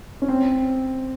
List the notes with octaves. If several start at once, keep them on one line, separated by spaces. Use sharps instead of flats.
C#4
C4